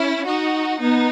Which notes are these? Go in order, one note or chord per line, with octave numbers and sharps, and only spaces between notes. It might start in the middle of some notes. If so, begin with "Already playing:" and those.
Already playing: C#4 E4
D#4 F#4
B3 D#4